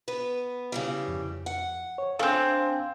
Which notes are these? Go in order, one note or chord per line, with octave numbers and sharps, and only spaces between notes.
B3 B4
C#3 E3 G3
F2
F#5
C#5
A3 C4 D4 F5 G#5